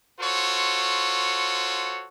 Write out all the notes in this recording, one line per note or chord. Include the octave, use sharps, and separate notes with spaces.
F4 F#4 A4 C5 C#5